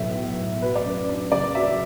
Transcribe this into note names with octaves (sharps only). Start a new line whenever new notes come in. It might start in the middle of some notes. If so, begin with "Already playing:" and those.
Already playing: B1 A2 B3 E5
F#3
A2
F#3 B4
D5
F#2 B4
D4
F#1 D5
F#3 E5